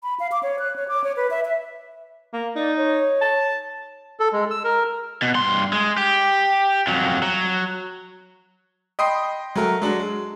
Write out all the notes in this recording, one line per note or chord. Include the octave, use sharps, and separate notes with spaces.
B5
F5
D6
C#5
F#6
C#5
D6
C#5
B4
E5
E5
A#3
D#4 D5
C#5
A5
A4
G#3
E6
A#4
B2
G2 C6
G#3
G4
F2 F#3
F#3
D#5 G5 B5 C6 D#6 C7
F#3 A3 A#4
F#3 G#3 D4
G#3